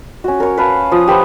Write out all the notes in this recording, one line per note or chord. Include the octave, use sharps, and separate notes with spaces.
C#4 F#4
A#4 C#5
B4 F5 A5
F3 D#6
G4 B4 C5 F#5